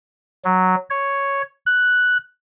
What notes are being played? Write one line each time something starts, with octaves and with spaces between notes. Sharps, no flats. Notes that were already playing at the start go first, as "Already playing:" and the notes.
F#3
C#5
F#6